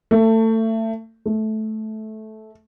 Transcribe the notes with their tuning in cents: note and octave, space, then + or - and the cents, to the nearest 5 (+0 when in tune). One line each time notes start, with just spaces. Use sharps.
A3 +25
A3 -15